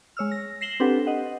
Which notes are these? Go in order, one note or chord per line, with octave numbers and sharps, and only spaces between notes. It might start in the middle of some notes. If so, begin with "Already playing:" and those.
G#3 C#5 E6 F6
A#6
A#6 C7 E7 F#7 G7
C4 D4 G4 A4 B4 F#5
D#5 F#5